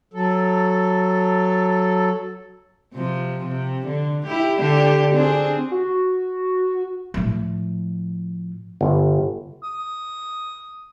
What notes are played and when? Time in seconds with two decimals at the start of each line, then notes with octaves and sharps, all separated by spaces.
0.14 F#3 A4
2.94 C3 F3
3.46 C3
3.86 D3
4.26 E4 G4
4.60 D3 D4 G4
5.13 C4 D4 G#4
5.72 F#4
7.14 A2 F3
8.81 G1
9.64 D#6